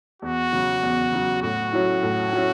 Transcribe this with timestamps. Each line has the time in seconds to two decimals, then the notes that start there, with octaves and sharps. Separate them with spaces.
0.22 E2 F#4
0.53 C#3 F#3
0.83 E2
1.12 C#3 F#3
1.42 A2 F#4
1.73 F#3 C#4 E4
2.03 A2
2.33 F#3 C#4 E4